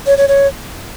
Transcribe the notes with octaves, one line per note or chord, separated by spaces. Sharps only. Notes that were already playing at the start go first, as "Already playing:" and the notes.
C#5
C#5
C#5